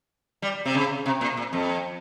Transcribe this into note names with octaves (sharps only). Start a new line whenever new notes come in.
G3
C3
C#3
C3
A#2
A#2
F2